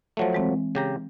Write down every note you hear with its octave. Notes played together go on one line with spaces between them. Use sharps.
F3 F#3 A3
E3 G#3 C4
C#3 G4 A#5